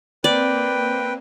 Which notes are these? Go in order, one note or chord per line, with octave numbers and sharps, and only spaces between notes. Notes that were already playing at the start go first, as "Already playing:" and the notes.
A#3 C4 B4 D5 G5